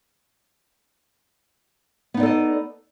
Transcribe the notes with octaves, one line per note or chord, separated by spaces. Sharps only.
B3 D#4 A4 D5 D#5